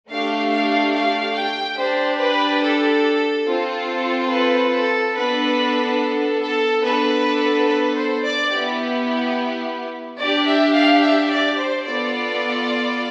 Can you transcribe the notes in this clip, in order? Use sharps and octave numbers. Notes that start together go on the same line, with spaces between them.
A3 D4 G4 F5
F5
F5
G5
D4 G4 C5
B4
A4
C4 F4 A4
B4
A4
B3 D4 A4 B4
A4
B3 D4 A4 B4
B4
C5
D5
B3 E4 G4
D4 G4 D5
E5
F5
E5
D5
C5
B3 F4 A4 D5